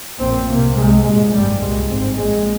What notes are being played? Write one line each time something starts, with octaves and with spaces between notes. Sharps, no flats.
A#1 A#2 C4
C2 C3 A#3
C2 C3 G#3
C2 A#2 G#3
G#1 G2 G3
C2 A#2 G#3
G#1 G#2 C4
A#1 A#2 G#3